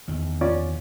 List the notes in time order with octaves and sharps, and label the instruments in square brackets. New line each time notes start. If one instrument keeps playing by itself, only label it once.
[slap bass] E2 D#3
[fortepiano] C#4 F4 D5